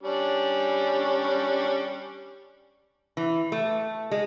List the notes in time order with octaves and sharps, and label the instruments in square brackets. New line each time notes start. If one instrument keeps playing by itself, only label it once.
[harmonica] G3 C#4 D4
[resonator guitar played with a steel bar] E3
A3
G#3